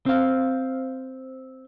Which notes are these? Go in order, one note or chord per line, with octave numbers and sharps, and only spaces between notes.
C4 F5